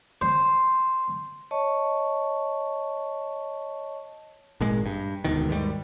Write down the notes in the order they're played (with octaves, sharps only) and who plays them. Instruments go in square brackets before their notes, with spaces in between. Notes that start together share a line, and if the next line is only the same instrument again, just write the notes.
[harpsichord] C5
[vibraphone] C#5 D#5 A5 C#6
[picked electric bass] G#1 A#2 G#3
G2
E1 D2 B2 D#3
D#2 G#2 G3